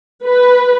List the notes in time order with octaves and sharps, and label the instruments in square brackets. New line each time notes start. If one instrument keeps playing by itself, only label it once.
[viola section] B4